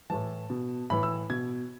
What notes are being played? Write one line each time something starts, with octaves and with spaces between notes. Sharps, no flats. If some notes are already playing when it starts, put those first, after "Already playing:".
A2 E3 A5
B2
A2 E3 B5
E6
B2 G#6